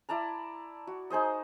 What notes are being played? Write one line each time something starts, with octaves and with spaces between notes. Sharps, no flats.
E4 D5 A5 A#5
F#4
D#4 G#4 C5 D#5